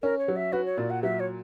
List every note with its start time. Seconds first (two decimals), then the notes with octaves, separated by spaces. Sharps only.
0.03 C#4 A#4
0.19 C#5
0.28 F#3
0.36 E5
0.53 F#4 B4
0.66 C#5
0.78 A#2 D5
0.90 F#5
1.03 F#3 E5
1.20 C#5